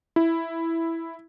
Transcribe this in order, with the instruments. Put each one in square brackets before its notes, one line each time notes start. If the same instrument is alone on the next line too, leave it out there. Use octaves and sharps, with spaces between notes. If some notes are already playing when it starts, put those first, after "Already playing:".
[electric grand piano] E4